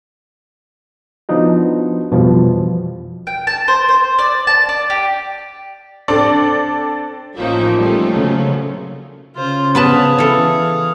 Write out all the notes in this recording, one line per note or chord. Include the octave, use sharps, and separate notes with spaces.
F3 B3 D4 D#4 F#4
F2 B2 E3 F3 G3
G5
A5
C5
C5
D5
A5
D5
G4
C4 D4 A4 D5
A1 F3 A#3 C#4 D#4 E5 G5
G3 A3 A#3 C#4 D#4 F4 A4
C#3 F#3
C#3 F4 C5
B3 G#4 B4 F5 A5
E3 A4